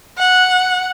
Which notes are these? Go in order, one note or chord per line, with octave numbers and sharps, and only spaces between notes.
F#5